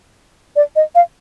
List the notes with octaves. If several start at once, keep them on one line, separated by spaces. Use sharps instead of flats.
D5
D#5
F5